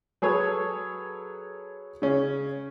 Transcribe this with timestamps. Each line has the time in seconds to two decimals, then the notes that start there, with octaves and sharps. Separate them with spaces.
0.22 F#3 G#4 A4 B4 C#5
2.02 C#3 C#4